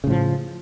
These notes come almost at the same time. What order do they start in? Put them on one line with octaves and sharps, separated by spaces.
C#3 A2 F3